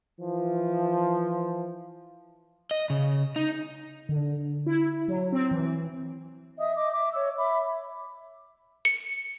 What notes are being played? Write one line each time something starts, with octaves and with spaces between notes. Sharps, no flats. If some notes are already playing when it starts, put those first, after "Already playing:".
E3 F3
D#5
C#3
D#4
D3
E4
F#3
C4
E3
D#5 E5 D#6
D#5 D6
E5 D6
C#5 E6
E5 B5 D6
C#7